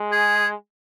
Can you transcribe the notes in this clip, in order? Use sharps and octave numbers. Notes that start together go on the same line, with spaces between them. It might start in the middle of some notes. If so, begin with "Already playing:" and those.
Already playing: G#3
G#4